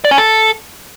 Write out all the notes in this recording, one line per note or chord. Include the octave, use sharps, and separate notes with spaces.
D5
C#4
A4